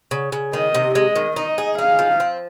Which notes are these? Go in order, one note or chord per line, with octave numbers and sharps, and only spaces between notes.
C#3
C#3
D#3 D#5
C3
G#3 D#5
D#3
D#4 D#5
G#4
D#4 F5
F3
C4